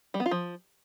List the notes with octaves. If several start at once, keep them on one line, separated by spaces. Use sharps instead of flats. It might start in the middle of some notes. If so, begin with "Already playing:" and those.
G3
B3
F4
F3